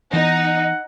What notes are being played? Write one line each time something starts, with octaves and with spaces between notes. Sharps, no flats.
E3 B3 D#4 F#5